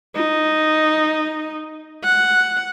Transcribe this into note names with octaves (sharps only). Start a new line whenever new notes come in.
D#4
F#5